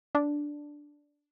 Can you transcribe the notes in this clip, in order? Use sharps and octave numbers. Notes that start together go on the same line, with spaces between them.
D4